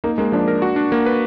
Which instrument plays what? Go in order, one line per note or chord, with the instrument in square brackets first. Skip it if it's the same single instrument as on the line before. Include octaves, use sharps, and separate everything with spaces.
[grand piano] A#3 [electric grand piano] D#4
[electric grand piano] G#3 [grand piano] A#3
[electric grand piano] F3 [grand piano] D4
[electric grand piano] A#4
F#4
D4
A#3
B4